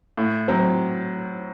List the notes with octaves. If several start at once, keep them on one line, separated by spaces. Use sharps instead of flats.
A2
F#3 C4